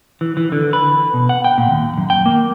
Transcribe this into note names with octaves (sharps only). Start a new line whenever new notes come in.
E3
E3
D3
B4
B2
F#5
G5
A#2
D#2
F#2
G5
A#3